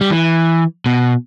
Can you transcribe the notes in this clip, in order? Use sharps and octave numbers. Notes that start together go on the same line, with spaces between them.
G3
E3
B2